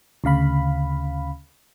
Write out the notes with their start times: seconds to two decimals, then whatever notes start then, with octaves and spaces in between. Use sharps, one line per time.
0.24 D2 C#3 F5 B5